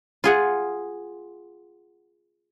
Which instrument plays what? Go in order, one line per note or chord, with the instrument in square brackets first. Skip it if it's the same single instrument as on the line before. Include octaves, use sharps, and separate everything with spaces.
[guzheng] F4 G#4 F#5